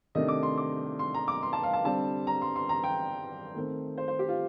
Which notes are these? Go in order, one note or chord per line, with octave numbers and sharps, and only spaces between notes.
C3 D#3 A3 D4 D#5
D6
C6
D6
C6
A#5
D6
C6
A5
F5
A5
D3 G3 C4 A5
A#5
C6
C6
A#5
G5
D#3 A3 C4
C5
C5
G4
F4